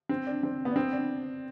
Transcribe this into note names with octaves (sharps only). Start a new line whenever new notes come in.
C4
D4
C4
B3
D4
C4
D4